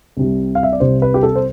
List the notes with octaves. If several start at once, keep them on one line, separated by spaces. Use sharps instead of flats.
C2 C3 G3
F5
E5
D5
C2 C3 G3 C5
B4
G4
A4
C5